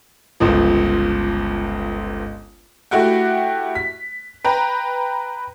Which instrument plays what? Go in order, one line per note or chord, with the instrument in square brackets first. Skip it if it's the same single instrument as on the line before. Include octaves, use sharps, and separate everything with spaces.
[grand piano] G1 C#2 F3
[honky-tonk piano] A3 E4 F#4 G4 F#5 G5
B6
B4 G5 A#5